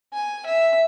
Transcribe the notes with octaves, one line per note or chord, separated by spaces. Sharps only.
G#5
E5